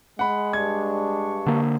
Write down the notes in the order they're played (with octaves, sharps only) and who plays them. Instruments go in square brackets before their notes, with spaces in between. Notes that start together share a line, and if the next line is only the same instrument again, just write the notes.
[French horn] G#3 [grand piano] F#5 B5
[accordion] G2 D4 C#6 [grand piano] G#6
[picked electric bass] D3 A#3